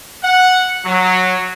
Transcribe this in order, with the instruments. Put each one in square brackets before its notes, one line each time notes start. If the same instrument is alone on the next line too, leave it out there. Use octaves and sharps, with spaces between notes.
[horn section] F#5
F#3